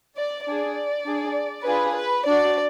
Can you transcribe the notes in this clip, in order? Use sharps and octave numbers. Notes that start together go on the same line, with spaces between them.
D5
D4 G#4 D5
D4 G#4
D4 F4 G#4 B4
B4
D4 F#4 D5